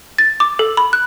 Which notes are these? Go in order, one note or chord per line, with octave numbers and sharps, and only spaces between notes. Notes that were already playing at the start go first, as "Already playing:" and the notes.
A6
D6
A4
B5
F#6